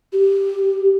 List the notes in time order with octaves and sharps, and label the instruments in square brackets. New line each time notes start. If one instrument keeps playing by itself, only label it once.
[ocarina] G4